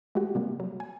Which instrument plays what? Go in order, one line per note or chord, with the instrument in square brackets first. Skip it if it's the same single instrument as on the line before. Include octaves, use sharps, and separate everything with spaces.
[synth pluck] G#3 A3 F#4 G4
C3 G3 A#3
F#3
G#5